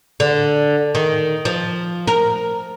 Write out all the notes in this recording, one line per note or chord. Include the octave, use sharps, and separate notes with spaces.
D3
D#3
F3
A#4